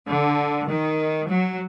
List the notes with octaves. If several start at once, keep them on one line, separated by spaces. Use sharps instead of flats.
D3
D#3
F#3